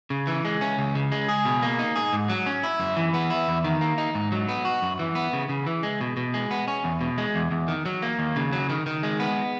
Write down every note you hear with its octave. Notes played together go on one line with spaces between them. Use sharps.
C#3
E3
G#3
C#4
C#2
C#3
G#3
G#4
B2
A#3
D#4
G#4
G#2
F#3
C#4
E4
F#2
E3
B3
E4
E2
D#3
A#3
D#4
G#2
F#3
B3
F#4
F#2
E3
B3
C#3
C#3
E3
G#3
B2
B2
G#3
B3
C#4
E2
B2
G#3
E2
E2
D#3
F#3
A#3
D#2
C#3
F#3
D#3
D#3
G#3
B3